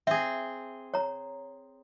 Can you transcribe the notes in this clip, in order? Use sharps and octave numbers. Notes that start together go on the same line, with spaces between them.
C4 G#4 E5
C#5 A#5